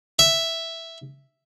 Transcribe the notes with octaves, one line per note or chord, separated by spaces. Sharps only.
E5